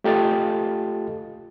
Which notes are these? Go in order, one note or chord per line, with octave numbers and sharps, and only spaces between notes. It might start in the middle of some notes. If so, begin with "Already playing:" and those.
A3 F4 G4 A4 D#5 A6